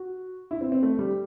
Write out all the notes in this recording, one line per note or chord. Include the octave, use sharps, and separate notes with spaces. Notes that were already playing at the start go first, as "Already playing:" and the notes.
Already playing: F#4
E4
C4
C4
A3
G3